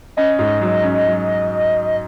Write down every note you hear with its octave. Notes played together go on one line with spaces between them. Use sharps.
C#4 D#5
G#2
F#3
C#4
F#3